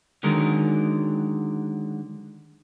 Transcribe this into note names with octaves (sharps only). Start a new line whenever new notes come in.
D3 D#3 F#3 G#3 A#4